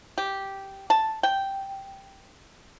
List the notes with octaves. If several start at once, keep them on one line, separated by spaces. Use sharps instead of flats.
G4
A5
G5